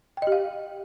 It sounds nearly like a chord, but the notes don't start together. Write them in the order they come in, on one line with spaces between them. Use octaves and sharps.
G5 D#5 G4 F5